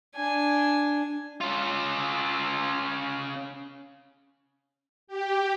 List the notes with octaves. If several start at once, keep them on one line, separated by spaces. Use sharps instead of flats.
D4 G#5
C#4 F4
G4